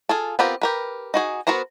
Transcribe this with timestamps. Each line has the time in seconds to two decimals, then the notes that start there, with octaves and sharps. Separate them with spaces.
0.09 F4 G#4 A4
0.39 B3 C4 F4 G4 A#4
0.62 G4 A#4 B4
1.14 D#4 F#4 G#4
1.47 B3 F#4 A#4 C5 A#5